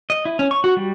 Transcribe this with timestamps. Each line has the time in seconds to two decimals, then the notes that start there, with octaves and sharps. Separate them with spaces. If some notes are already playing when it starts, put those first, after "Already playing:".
0.10 D#5
0.25 E4
0.39 C#4
0.51 C#6
0.64 F#4
0.77 G3